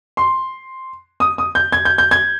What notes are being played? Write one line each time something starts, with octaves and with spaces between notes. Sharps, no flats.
C6
D#6
D#6
G6
G#6
G6
G6
G#6